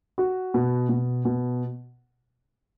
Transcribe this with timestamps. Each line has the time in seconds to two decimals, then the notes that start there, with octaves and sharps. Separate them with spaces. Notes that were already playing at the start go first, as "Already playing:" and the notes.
0.18 F#4
0.54 B2
0.89 B2
1.25 B2